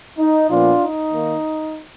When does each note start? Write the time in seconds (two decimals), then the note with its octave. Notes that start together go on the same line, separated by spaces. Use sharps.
0.18 D#4
0.49 A#2 F3 B3 D4 F4
0.81 D#4
1.13 D#3 A#3